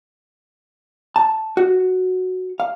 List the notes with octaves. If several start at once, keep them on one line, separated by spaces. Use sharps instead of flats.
A5
F#4
F5